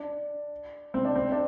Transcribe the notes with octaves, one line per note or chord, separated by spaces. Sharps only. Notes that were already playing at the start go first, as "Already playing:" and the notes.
Already playing: D4
C4
D4
C4
D4